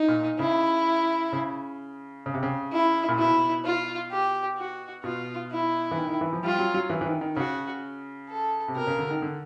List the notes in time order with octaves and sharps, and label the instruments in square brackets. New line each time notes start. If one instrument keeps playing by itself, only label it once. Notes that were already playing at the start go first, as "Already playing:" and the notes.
Already playing: [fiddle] D#4
[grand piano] A#2
[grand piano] C#3 [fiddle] E4
[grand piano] C#3
C#3
C3
C#3
[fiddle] E4
[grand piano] A#2
[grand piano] B2 [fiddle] E4
[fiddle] F4
G4
F#4
[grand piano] B2 [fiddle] F4
[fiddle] E4
[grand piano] E3
D#3
D#3
E3
F3
[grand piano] G3 [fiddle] F4
[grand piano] F#3
F#3
E3
E3
D#3
D#3
[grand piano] C#3 [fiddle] F#4
[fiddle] A4
[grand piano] C3
[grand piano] B2 [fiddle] A#4
[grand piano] C#3
D3
D#3
D3